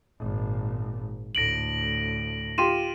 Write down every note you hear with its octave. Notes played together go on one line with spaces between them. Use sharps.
G#1 A#2
D2 A2 A#6 D7 F#7
F4 G4 C6 D#7 E7